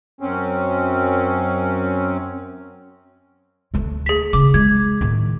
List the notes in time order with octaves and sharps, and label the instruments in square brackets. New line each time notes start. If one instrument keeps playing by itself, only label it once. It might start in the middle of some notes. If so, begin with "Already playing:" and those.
[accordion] F#2 C4 C#4
[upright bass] D2 A3
[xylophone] G#4 B6
[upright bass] C#3 [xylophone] D6
[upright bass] G#3 [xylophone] G#6
[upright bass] A2 D#3